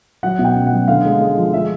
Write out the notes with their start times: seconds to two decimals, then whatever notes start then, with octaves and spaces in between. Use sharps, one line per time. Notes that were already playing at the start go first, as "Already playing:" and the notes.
0.23 F#3 F#5
0.39 B2
0.45 G5
0.55 C#4
0.67 F#5
0.72 F#3
0.88 D3 F5
1.05 G#3
1.20 G#3
1.37 F3
1.53 G#3 E5